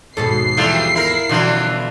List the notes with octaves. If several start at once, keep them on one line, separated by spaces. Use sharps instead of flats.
D#2 G#2 B2 A4 C7
C3 E3 F3 G3 F4 A4
E4 A#4
B2 D3 E3 F3 G3 C#4 F#4